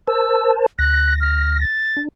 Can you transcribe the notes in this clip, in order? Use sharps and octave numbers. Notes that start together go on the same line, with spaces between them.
A#4 C5 A5 E6
D2 F#6 A#6
F6
A6
D4